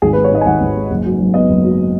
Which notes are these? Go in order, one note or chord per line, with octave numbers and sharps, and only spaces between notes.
G#1 G#4
B4
G#3
C#5
G#2 D#5
G#5
G#1 F#5
G#1
G#3
F#1
F#3
F#2
B3 D#5
F#1
F#3